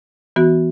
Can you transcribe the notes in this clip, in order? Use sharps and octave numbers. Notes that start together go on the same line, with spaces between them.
E3 B3 F#4